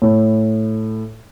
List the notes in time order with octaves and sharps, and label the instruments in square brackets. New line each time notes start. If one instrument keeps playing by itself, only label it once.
[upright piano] A2